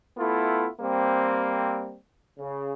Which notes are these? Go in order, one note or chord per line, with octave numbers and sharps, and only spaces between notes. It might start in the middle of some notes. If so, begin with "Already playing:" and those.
A3 B3 E4 F4
G3 A#3 C4
C#3